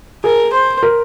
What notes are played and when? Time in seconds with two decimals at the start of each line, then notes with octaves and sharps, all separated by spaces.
0.24 G#4 A#4
0.53 C5
0.83 A#4